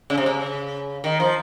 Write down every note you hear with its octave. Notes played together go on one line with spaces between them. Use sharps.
C#3
C3
C#3
D#3
F3